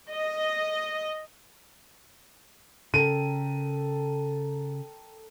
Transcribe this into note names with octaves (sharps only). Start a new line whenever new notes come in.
D#5
C#3 A4 A#4 G5 D#7